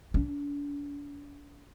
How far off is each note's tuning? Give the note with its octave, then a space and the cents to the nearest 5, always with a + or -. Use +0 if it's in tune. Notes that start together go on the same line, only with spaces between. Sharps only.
D4 -40